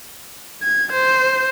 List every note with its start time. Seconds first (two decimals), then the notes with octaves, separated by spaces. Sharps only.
0.63 G#6
0.92 C5